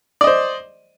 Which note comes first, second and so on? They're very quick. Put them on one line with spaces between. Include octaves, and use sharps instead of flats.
D5 D#5 C5